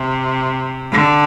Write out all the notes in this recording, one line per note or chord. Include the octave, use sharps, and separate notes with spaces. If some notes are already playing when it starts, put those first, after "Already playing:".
Already playing: C3
D3